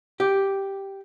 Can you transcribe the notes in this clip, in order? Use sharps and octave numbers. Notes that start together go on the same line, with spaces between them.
G4